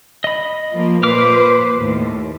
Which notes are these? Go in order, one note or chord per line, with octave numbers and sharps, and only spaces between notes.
D#5 B5
F3 A#3
A#2 B4 C5 D6 F6
D#2 A2